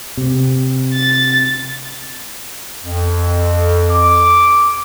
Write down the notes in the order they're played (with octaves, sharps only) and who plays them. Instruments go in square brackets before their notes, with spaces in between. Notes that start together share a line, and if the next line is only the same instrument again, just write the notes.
[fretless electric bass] C3
[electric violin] A6
[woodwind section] F2
[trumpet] D6